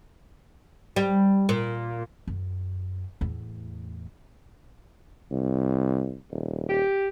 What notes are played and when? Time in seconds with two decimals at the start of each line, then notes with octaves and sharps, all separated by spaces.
0.96 G3
1.49 A#2
2.27 F#2
3.21 E2 A2
5.32 C2
6.31 D#1
6.69 G4